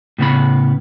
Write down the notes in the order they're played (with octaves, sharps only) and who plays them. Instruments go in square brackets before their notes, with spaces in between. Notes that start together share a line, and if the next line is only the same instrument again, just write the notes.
[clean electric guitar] A2 C#3 B3 C#4 B5